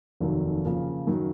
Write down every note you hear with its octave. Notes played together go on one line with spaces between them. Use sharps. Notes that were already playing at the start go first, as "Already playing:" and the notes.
F1 D#2 D#3 F#3 A#3
C#3 F3 A#3
F#2 D#3 F#3